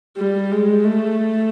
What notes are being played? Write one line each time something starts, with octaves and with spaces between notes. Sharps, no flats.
G3
G#3
A3